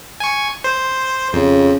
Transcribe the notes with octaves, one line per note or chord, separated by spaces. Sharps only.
G#5 C#6
C5
F2 C#3